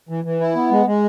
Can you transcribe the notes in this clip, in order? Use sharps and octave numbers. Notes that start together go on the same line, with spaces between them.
E3
E3
E4
B3
G#3
G#3